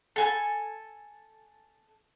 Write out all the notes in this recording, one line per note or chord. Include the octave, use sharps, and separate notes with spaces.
A4 G#5 A5